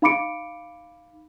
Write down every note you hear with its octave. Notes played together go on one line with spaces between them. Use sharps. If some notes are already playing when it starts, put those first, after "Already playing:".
D#4 F5 B5 D6 C#7 D7